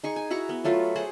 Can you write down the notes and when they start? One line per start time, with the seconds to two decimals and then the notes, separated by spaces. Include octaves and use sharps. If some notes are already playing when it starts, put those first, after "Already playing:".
0.04 D#4 G#4 C#6
0.16 G#5
0.30 E4 F#4 F#5 A#5
0.49 B3
0.64 F#3 A3 F4 B4
0.95 F#4 G#4 C5 F#5